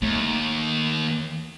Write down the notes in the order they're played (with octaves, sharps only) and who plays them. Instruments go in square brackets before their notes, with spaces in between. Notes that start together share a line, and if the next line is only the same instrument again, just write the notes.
[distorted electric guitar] D#2 [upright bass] A3